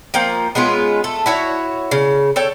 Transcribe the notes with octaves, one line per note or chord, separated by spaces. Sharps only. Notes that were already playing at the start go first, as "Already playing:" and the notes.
F3 A#3 F5 G5
G#3 B3 C#4 F4
A3 A4
E4 F#4 C#5
C#3
A4 C#5 G5